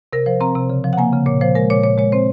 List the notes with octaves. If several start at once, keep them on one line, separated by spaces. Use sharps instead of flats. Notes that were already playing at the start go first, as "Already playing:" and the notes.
C3 A#4
F3 C5
C4 A#5
C3
C#3
F3
F#5
A#3 G#5
C#3
A#2 C#5
F3 C5
G#3 A#4
A#2 C#5
A#2 C#5
G#3 C#5
C4 C5